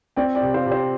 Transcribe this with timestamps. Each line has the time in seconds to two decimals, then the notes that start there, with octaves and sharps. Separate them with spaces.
0.16 C4 D5 G5
0.35 D5 G5
0.41 C3
0.54 C5 F5
0.66 C3
0.72 C5